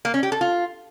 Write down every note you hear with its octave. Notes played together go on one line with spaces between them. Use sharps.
A#3
C#4
G4
A4
F4